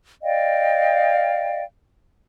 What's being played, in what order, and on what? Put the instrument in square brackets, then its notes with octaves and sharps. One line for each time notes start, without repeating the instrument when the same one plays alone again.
[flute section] D5 D#5 F5 G5